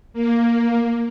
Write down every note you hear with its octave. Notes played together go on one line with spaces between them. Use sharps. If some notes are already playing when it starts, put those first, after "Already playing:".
A#3